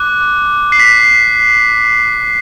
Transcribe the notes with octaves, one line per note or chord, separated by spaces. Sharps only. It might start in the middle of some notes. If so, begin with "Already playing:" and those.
Already playing: D6 F#6
C7
B6